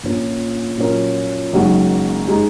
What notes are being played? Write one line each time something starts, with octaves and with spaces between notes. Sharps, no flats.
A#1 A#2 A#3 C#4
A#2 F#3 C#4 A#4
F#1 F#2 D#3 G#3 F#4
G#3 D#4